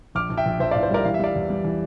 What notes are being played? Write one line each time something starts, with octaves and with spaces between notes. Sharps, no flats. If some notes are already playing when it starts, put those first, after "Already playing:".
A#1 D6 F6
A#1
E5 G5
A#1
A#1 C5 E5
A2 D5 F5
C5
G3 A#4 D5
E3 F5
E5
G3 D5 F5
E2
G3
E3